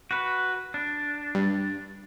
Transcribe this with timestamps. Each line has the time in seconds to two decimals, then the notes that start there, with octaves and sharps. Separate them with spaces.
0.11 F#4 B4
0.74 D4
1.35 G2